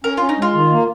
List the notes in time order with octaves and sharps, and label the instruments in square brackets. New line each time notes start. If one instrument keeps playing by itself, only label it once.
[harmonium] C#4 [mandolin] A#4
[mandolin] F4
[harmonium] C#4
[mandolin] D#4
[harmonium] G#3 [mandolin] F4
[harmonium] D#3
A#3